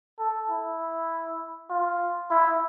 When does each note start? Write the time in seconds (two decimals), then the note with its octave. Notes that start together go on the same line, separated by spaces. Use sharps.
0.19 A4
0.50 E4
1.70 F4
2.31 E4